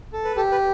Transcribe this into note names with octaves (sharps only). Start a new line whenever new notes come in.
A4
B4
G4 A4
B4